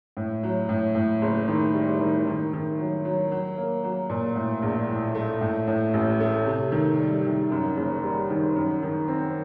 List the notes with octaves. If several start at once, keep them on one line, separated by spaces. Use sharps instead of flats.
A2
F#3
A2
A2
F#1
D#3
G3
D#3
D#3
D#3
F#3
F#3
F#3
A#3
F#3
A#2
A2
A#1
A2
A3
A2
A2
A1
A3
C3
D#3
G3
D#3
F#2
F#1
G3
D#3
F#2
D#3
C4